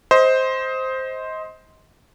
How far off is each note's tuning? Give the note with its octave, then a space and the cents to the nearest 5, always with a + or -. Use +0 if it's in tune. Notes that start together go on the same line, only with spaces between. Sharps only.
C5 +0 D#5 +25